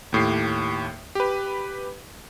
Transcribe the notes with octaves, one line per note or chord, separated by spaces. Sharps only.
D#2 A2 G4 C7
G4 B4